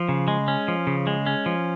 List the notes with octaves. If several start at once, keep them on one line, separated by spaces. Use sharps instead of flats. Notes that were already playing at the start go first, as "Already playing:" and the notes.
Already playing: F3
C#3
G#3
C#4
F3
C#3
G#3
C#4
F3